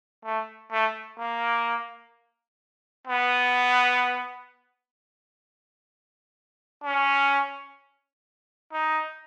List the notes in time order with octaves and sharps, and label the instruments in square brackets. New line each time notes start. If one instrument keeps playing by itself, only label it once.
[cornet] A3
A3
A#3
B3
C#4
D#4